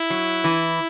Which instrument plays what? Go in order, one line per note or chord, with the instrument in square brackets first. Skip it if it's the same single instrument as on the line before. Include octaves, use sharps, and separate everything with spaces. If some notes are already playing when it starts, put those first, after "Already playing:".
Already playing: [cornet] E4
[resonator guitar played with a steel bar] F#3
E3